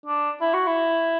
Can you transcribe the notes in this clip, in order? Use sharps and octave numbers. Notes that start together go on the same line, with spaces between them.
D4
E4
F#4
E4